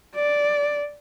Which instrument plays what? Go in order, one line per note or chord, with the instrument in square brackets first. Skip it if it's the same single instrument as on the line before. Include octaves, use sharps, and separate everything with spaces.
[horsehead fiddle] D5